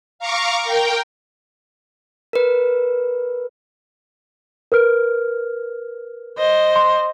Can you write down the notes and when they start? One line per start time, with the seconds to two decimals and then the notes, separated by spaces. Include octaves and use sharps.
0.19 F5 A#5 C#6 D6
0.62 A#4 G5
2.33 A#4 B4
4.72 A#4 B4 F6
6.38 C5 D#5
6.76 C6